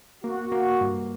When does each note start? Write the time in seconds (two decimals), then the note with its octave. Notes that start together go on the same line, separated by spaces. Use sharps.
0.24 A#3 F#4
0.52 A#3
0.81 G2